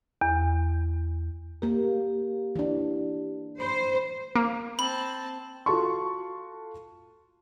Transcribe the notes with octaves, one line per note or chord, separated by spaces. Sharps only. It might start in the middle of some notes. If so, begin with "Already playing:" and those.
E2
A#3 G4 A#4
E3 D4
C5 B5
A#3
C4 A5 B5 F#7
F4 F#4 A4 A5 C6 C#6